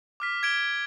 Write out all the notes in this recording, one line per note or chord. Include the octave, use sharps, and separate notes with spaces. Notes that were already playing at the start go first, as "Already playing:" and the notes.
D6 F6 B6
G#6 D7 G7